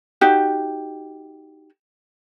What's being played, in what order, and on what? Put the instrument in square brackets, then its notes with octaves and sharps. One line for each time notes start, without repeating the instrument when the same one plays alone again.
[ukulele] D#4 F#4 G4